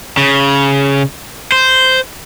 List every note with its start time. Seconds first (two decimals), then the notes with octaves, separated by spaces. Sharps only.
0.17 C#3
1.52 C5